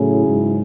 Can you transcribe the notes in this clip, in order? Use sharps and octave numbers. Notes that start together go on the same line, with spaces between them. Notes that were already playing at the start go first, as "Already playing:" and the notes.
Already playing: A2 C#3 F#3 C#4 E4 G#4
G#2